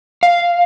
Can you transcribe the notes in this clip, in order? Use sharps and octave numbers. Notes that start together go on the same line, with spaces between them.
F5